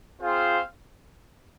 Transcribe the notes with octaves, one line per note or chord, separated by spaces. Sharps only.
C4 F4 G#4 C5 F5